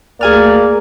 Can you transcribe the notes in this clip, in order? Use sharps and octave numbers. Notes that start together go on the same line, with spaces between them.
D2 A#3 G#4 D5 G#5 F6